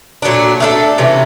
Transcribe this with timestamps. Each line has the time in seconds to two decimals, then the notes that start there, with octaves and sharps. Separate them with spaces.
0.22 A#2 F#3 A3 D4
0.60 A3 D4 F4 A4
0.98 C3 E3 A3 C#4